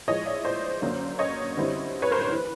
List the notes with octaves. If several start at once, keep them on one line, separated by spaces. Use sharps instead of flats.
A2 F3 G#3 C#5 D#5
D5 E5
C5 D5
F#2 D3 F#3 A#3
C#5 D#5
F#2 D3 G3 C4 E4
B4 C#5
A#4 C5
B4
E3